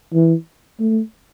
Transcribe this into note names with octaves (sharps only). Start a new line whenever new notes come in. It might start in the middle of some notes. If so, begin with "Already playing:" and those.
E3
A3